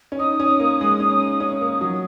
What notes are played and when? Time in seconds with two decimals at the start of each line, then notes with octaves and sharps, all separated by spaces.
0.12 C#4
0.19 D#4 D#6
0.40 C#4
0.60 A#3
0.81 G#3
1.00 C#4
1.40 C#4
1.61 A#3
1.81 F#3